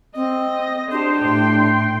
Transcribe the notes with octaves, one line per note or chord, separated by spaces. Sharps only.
C4 D#5
D4 G4 C5
A2 G5 C6